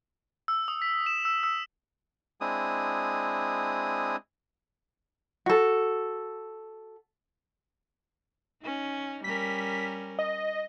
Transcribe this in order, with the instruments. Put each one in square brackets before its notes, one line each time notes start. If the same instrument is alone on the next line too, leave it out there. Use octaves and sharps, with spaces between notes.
[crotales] E6
D#6
B6
E7
E6
E6
[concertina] G#3 C4 D4 E4 D#6
[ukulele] F#4 A4
[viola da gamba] C#4 D#4
[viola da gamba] G3 C#4 A#4 [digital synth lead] B6
[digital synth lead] D#5